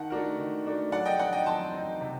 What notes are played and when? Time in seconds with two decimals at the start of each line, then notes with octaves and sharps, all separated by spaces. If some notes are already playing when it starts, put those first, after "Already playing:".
Already playing: D#3 F#5 A5
0.10 A3 D4 F#4 A#4
0.38 D#3
0.65 A3 D4 F#4 A#4
0.92 F#3 D5 F#5
1.06 D#5 G5
1.19 C4 D#4 D5 F#5
1.33 D#5 G5
1.46 F#3 A5 C6
1.73 C4 D#4
2.01 C3